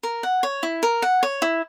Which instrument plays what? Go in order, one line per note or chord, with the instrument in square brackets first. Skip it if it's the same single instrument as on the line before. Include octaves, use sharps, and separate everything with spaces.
[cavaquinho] A#4
F#5
C#5
E4
A#4
F#5
C#5
E4